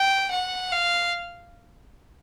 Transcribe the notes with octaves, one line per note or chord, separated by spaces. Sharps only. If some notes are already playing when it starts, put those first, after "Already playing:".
Already playing: G5
F#5
F5